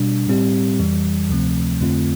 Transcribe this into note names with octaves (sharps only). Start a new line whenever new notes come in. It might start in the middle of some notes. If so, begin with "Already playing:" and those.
Already playing: B2 G3 D4
A2 G3 C4 G4
F2 E3 G3
D2 C3 F3 A3 C4
F2 D3 A3 C4 F4